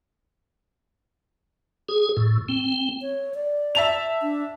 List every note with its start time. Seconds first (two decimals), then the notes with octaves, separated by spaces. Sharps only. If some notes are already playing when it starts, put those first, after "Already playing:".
1.89 G#4
2.17 A2
2.49 C4
3.02 C#5
3.34 D5
3.75 E5 A5 F7
4.22 D4